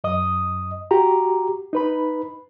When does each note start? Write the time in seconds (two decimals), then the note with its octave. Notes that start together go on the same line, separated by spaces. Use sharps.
0.04 F#2 D#5 D#6
0.91 F#4 G4 A#5
1.73 D#4 B4 B5